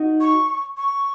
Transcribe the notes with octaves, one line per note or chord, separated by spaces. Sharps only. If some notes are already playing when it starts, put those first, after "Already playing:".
Already playing: D#4 F#4
C#6
C#6